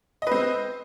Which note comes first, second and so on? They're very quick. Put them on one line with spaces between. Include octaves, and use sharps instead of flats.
D#5 B4 C4